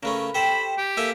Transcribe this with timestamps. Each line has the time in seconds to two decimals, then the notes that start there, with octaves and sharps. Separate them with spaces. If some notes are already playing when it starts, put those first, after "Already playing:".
0.03 C#3 A3 C#4 A#4 B4
0.35 G4 A4 C5 B5
0.78 G4
0.97 A#3 A4 E5 G#5